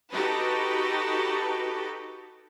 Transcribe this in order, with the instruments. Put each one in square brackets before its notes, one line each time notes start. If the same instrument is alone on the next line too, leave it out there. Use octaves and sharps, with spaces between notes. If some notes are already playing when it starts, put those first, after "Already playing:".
[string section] D#4 F#4 G4 A4 B4